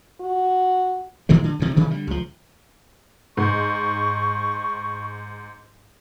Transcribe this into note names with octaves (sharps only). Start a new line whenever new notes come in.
F#4
A2 D#3 E3 G#3
D3
D2 C3
C3 D#3 E3
D3 G3
C#2 F3
G#2 C#6